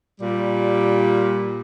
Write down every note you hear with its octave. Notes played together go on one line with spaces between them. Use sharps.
A#2 G3